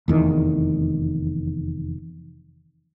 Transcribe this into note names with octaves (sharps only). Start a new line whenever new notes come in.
F1 E2 D#3